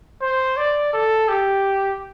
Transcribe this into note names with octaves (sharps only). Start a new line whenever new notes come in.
C5
D5
A4
G4